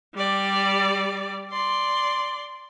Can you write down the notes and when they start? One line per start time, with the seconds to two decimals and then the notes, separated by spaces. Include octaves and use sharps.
0.15 G3 D5
1.51 D5 C6